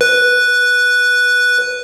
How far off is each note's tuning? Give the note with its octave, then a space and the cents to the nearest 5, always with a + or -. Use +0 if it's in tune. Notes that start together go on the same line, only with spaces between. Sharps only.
B4 -5